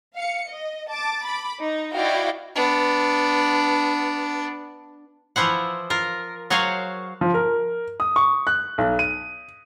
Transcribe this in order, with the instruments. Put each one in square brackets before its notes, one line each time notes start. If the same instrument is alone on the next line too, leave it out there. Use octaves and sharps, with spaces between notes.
[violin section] F5 C#7
D#5
A5 D6 A6
B5 D6
D#4
E4 F#4 D5 D#5 F5 G5
[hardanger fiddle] B3 D4
[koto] E3 F3 E4 C5 F#5
F4 A#4
F#3 F#4 G#4 C5 C#5 F5
[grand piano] F3
A#4
D#6
C#6
F#6
B1
D#7